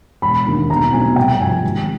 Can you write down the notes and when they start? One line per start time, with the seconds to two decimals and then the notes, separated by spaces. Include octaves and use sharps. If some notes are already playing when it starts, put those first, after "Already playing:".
0.22 E1 B5
0.47 D#2 D3
0.70 B1 A#5
0.92 B2 F#3 A3 C4 G#5
1.16 C2 G5
1.40 C3 F3 G#5
1.64 G#1